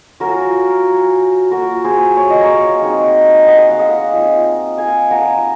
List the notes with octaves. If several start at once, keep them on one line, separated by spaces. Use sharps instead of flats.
F#3 C#4 F4 F#4 A#4
A#3 F4 F#4 A#4
G#4 C5
C#5
D#5
A#4 C#5
G#3 C4 D#4
D#5 F#5
F5
D#5 F#5
F3 C4 D#4
F5 G#5
F#5 A#5